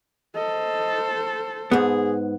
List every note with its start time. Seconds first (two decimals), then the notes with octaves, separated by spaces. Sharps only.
0.36 A4 C5 D#5
1.71 G#2 B3 G#4